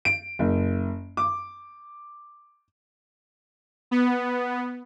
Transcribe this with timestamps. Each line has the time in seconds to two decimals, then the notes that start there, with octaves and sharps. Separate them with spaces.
0.05 D7
0.39 F#1
1.17 D6
3.91 B3